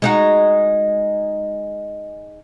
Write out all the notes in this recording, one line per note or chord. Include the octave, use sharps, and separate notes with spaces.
G#3 D#4 F#4